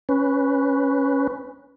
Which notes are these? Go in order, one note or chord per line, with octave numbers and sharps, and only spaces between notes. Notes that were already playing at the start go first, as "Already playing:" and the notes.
C#4 B4